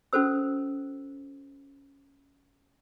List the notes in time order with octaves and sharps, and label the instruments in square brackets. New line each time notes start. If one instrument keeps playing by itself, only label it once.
[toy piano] C#4 F#4 A4 C5 E6